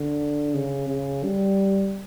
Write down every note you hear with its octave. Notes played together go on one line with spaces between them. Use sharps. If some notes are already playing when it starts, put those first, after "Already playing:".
Already playing: D3
C#3
C#3
G3